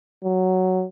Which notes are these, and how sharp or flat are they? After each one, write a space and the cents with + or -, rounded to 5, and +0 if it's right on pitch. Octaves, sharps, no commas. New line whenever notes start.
F#3 +5